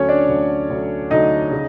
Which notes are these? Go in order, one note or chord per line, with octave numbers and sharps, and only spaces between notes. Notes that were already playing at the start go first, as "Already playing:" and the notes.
Already playing: D2 D3 F#3 C#4 C#5
D4 D5
D2 D3 F#3
D2 D3 F#3
D2 D3 F#3 D#4 D#5
C#3